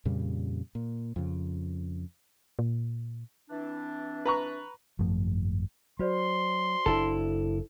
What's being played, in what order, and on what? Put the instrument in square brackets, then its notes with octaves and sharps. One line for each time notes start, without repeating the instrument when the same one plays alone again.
[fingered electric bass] F2 A#2 C#3 G3
A#2
F2 C#3
[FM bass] A#2
[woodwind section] E3 C4 D4
[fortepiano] B4 A#5 C#6
[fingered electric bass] G#1 F#2 F3 A3
[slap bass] F#3 [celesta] F#4 C5 D5 [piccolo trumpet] C6
[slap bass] F#1 D4 [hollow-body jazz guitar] E4 A4